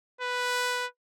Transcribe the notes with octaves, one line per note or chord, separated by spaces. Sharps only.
B4